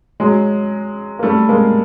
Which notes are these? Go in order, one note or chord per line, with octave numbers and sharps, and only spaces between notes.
F#3 G#3
A#3
G3 A3
G#3 A#3